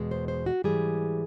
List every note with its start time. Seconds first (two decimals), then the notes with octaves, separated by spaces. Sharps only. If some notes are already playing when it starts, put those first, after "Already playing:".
Already playing: E2 B2 G#3
0.11 C5
0.28 C5
0.46 F#4
0.64 G#2 E3 G3 G#4